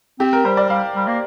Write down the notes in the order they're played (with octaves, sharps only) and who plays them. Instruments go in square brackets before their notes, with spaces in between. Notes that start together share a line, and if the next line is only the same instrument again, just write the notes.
[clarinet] C4 [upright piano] G4
[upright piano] A#4
[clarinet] G3 [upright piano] C5
[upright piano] D5
[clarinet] G3 [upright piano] F5
[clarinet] G3
A#3